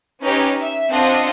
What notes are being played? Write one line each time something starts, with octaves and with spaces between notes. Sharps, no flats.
C#4 D#4 G4 B4 C#5
E5
C4 D4 F4 D#5 F#5